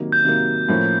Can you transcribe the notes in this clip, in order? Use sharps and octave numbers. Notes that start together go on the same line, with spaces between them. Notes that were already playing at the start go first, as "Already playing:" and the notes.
Already playing: C3 D#3 F#3 A#3
G6
C3 D#3 F#3 A#3
A2 F3 A#3 C#4